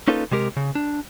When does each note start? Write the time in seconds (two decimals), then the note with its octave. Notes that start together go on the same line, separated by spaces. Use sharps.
0.08 A#3 C#4 D#4 F4 A4 B4
0.31 C3 G#3 G4 A#4
0.57 C#3
0.75 D4